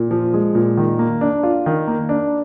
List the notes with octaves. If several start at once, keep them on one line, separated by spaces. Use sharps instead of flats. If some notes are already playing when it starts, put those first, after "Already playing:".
Already playing: A#2
F3
G#3
A#2
D#3
A#3
D4
F4
D#3
A#3
D4